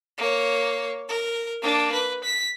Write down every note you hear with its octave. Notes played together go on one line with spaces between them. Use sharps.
A#3 C#5
A#4
A#3 D4
B4
B6